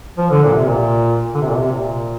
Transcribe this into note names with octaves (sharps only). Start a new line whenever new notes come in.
F3
D3
A#2
C3
A#2
D3
C3
A#2
C3
A#2